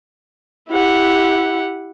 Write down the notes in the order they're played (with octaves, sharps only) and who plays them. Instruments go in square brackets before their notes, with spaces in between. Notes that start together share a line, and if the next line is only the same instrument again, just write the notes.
[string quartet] E4 G4 F#5